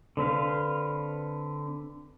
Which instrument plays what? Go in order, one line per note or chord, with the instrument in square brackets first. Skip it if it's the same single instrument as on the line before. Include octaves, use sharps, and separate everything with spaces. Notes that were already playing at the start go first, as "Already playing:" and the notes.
[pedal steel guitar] D3 C4 B4 F5